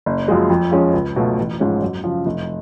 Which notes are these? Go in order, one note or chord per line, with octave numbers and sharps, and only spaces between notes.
F#1
F#2 F3 G#3
F2
F3 G#3 C#4
C#2
B2 F#3 A3 F4
A1
G#2 F3 G#3 C#4
F#2
C#3 F3
F1